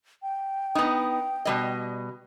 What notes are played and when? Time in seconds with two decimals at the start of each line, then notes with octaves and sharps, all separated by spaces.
0.22 G5
0.75 B3 D#4
1.45 B2 G3 D#5